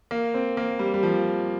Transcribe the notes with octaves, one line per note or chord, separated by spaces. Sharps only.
A#3
C4
A#3
G3
G3
F3